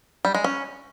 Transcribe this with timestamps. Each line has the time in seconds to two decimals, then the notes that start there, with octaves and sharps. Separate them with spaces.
0.25 G3
0.34 G#3
0.44 C#4